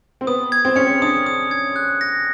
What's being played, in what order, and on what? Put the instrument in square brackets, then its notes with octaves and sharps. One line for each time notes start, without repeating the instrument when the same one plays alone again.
[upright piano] C4
[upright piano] B3 [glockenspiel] D#6
[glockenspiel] G#6
[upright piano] C4
[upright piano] C#4 [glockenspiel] C#7
[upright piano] C4
[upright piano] D4 [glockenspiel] D#6
[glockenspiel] D#6
G#6
F#6
A#6